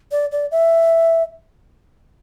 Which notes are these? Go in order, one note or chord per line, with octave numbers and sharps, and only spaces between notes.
D5
D5
E5